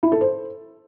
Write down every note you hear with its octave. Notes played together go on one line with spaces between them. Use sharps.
E4
A4
C5